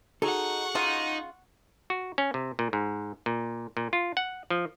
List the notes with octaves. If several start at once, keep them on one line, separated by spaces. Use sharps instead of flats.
D#4 F#4 G#4 A4 F#5 C#6
C#3 D#4 F4
F#4
C#4
C3
A#2
G#2
A#2
A#2
F4
F#5
F3